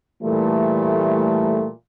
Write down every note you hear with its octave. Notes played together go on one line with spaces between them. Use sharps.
A#2 E3 G3 A3